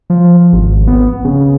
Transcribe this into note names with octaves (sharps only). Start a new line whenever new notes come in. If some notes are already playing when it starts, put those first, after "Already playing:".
F3
G#1
B3
C#3